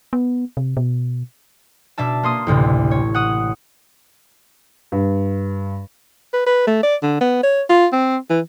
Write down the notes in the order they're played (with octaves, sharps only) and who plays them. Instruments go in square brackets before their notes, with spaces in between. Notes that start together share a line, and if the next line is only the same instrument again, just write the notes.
[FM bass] B3
C3
B2
[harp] B2 D4 E5 A5
A#3 C6 D#6
A1 D2 A2 C3
C#5
F#5 D#6
[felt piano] G2
[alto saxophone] B4
B4
A3
D5
D3
B3
C#5
F4
C4
E3